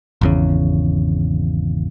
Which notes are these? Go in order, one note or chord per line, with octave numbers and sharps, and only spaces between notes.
G#1 E2 C#3